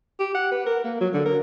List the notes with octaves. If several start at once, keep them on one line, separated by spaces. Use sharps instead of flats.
G4
F#5
B4
A#4
A#3
F#3
D3
A#4